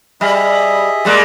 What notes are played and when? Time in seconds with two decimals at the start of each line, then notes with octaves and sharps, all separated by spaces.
0.21 G3 G#4 D#5 E5
1.05 G3 G#3 A#3